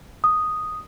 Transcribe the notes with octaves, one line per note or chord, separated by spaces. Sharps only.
D#6